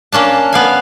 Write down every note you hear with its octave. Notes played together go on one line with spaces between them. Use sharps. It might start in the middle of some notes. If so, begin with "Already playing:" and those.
A#3 C#4 D4 A5
B3 F5 G#5